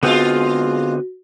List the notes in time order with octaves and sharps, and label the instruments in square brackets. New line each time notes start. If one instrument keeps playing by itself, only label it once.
[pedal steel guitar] D3 B3 C4 [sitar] G#3 F4 [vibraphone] F#4